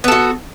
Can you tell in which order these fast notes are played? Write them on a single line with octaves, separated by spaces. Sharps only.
B3 A4 F#4